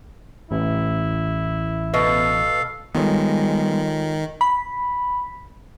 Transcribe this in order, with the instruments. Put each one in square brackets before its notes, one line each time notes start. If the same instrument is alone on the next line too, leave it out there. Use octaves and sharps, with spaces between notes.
[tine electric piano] A1 [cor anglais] E4
[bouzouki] B2 [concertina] A4 F5
[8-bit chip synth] D#3 [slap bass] G3 B3 [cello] G#3 [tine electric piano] F4 A4 C#5
[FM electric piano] B5